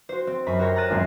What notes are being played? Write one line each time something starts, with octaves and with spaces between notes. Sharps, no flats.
F#4 C5
C4
F#2 C#4 C5 B5
F#4 G4 A#4 C5 C#5
A#5 F6 F#6 A6 D#7 E7
D#1 G#1 F#2 C4 C#4 C7